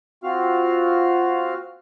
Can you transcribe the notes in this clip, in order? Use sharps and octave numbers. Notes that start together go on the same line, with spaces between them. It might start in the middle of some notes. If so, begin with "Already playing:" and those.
C4 F4 F#4 F5 F6